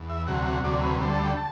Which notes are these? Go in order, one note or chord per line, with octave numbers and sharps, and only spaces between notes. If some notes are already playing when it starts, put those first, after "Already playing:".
Already playing: E2
E5
D2 C3 F#3 F#5
F#5
D2 C3 F#3 D5
B4
D2 D3 G3 C5
A5
G5
A5